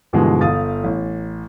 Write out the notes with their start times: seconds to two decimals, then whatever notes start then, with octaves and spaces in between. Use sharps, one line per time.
0.13 G2 B2 D3 E3 F3 G#3
0.41 G1 F5 D#6 A6
0.84 A1